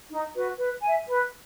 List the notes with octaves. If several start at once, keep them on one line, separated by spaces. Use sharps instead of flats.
D#4
F#4 B4
B4
E5 G#5
B4